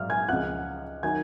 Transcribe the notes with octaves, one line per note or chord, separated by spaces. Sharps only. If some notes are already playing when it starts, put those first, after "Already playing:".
Already playing: A#1 G#2 F#3 F5 F6
G#5 G#6
C#2 C#3 F3 F#5 F#6
D#3 F#3 G#5 G#6